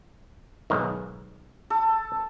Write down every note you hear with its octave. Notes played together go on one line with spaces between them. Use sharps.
B1 G#2 D#3
A4